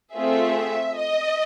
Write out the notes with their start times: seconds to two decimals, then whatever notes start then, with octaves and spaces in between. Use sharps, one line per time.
0.14 A3 C4 F4 G#4 E5
0.97 D#5